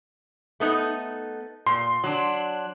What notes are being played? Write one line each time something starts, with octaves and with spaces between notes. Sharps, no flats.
A3 B3 D#4
A#2 C6
F#3 D4